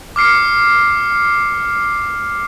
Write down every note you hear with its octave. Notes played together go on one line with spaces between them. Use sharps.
D6 F6 C7 C#7